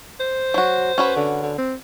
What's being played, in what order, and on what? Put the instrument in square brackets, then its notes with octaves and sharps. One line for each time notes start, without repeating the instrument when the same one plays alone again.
[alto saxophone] C5
[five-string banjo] F#3 F#4
C#4 F#4 B4
[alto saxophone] D3
D3
C4